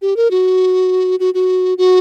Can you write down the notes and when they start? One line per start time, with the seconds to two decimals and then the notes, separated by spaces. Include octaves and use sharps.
0.02 G4
0.16 A#4
0.31 F#4
1.20 F#4
1.34 F#4
1.78 F#4